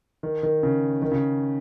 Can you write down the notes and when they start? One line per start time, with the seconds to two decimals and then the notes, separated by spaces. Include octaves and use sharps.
0.23 D#3
0.43 D#3
0.63 C#3
1.02 D#3
1.12 C#3